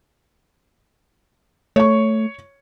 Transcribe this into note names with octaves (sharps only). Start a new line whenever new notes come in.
A3 C#5 C#6